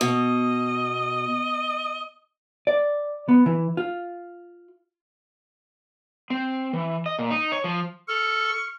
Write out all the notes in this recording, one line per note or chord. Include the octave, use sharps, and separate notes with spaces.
B2 D#5
D5
B3
E3
F4
C4
E3
D#5
A#2
D#4
C#5
F3
A4 C#6 F6